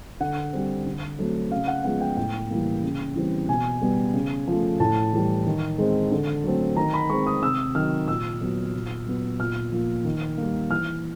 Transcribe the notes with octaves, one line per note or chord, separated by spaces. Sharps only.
D3 F#5
G3 C4
D3
F#3 A3 C4
C#3 F5
F#5
F3 G#3 B3 F#5
G5
A2 G5
E3 G3 A#3
C#3
E3 G3 C4
B2 G#5
G3 B3
C#3
F3 A3
A2 A5
E3 G3
D#3
G#3 C4
D3
F#3 A3 C4
D#3 A#5
B5
G#3 C4 C#6
D#6
C3 E6
D#3 F#3 F6
A#2 E6
F#3 B3
A#2
F#3 B3
A#2 F6
F3 A#3
D#3
G3 A#3
E3 F6